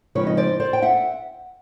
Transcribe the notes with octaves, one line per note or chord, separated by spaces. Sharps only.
C#3 F3 G#3 C4 D#4 B4 C#5
D#5
C5 D5
C5 D5
G5
E5 F#5